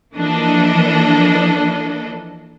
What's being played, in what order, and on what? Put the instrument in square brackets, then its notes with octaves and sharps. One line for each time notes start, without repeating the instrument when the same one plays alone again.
[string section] E3 F3 A#3 D4 A4 D#5